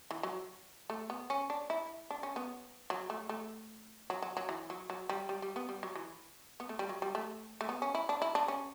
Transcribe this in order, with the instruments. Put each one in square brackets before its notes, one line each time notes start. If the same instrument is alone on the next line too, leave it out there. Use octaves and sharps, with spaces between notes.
[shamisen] E3
F#3
A3
B3
C#4
D4
E4
D4
C#4
B3
F#3
A3
A3
F#3
F#3
F#3
E3
F#3
F#3
G3
G3
G3
B3
G3
F#3
E3
B3
A3
G3
F#3
G3
A3
A3
B3
C#4
E4
D4
E4
D4
C#4